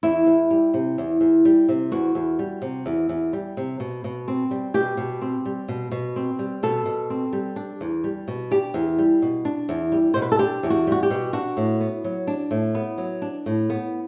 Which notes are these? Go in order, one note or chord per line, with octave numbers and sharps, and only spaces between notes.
E2 E4
E2
G3
C3
E2
E2
G3
C3
E2 F#4
E2
G3
C3
E2
E2
G3
C3
B2
B2
C4
G3
B2 G4
B2
C4
G3
B2
B2
C4
G3
B2 A4
B2
C4
G3
D4
E2
G3
B2
D4 G4
E2
G3
B2
D4
E2
G3
B2 C5
B4
A4
D4 G4
E2
F#4
G3 F#4
G4
B2
D4 F#4
A2
B3
F#3
D4
A2
B3
F#3
D4
A2
B3